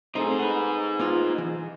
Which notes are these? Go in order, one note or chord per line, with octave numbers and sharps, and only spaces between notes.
A3 C4 D#4 G#4
B4 F#5
A#3 B3 F4
E3